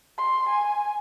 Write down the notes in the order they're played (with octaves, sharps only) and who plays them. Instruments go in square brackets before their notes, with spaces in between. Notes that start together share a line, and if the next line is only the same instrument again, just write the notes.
[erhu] C6
G#5